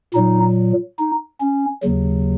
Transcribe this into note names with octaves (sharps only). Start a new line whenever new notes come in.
A#2 F#3 D#4
D#4
C#4
D#2 C#3 F#3